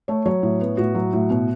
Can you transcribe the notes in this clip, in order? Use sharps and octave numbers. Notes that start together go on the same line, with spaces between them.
A3 C#5
F#3 C#5
A2
B3
A2 F#4
F#3
A2
B2